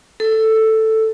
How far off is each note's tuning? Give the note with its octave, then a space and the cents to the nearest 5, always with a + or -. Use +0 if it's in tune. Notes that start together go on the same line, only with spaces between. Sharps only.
A4 +5